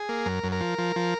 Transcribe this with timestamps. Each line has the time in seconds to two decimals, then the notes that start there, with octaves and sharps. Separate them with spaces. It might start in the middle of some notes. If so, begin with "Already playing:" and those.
Already playing: G#4
0.09 A#3
0.26 F#2 A#4
0.44 F#2
0.52 A#4
0.61 F3
0.78 F3
0.96 F3